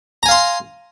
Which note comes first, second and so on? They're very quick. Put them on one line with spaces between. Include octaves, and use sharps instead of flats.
A#5 G#5 F5 C6